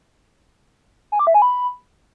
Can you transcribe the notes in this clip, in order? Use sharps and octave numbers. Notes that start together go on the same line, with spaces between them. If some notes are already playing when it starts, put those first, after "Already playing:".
G#5
D6
E5
G#5
B5